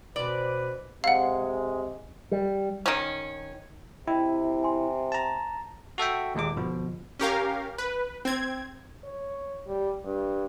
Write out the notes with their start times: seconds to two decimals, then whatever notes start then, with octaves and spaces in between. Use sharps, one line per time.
0.16 B2 C4 C#4 B4 D5
1.04 C3 G#3 F5 F#5
2.32 G3
2.86 D#3 C#4
4.08 C3 E4 D#5 E5 G5
4.63 G#5 C6
5.12 A5 A#5
5.98 F#4 A4 E5 G5
6.35 D#2 A#2 G#3 D6
6.56 G1 B2 F3
7.19 C#4 G4 A#4 F5
7.78 B4
8.25 C4 G#6
9.04 C#5
9.67 G3
10.04 G2